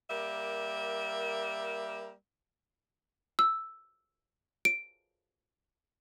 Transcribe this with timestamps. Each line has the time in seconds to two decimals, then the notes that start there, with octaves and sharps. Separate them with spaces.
0.10 G3 A#3 A#4 E5
3.39 E6
4.65 D7